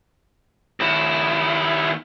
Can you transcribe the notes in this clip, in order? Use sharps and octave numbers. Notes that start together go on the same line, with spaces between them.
D#2 E4